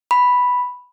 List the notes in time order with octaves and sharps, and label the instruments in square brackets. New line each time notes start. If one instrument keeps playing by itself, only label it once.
[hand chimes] B5